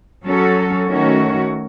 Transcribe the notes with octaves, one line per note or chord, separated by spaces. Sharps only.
F#3 C#4 F#4 A4
D#3 A3 C#4 F#4